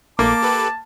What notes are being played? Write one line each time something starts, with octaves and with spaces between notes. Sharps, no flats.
A#1 A3 A#3 A5 D6
G4 A4 B4